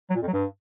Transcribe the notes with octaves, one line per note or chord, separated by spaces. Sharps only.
F#3
A#2
F2
F#3
G2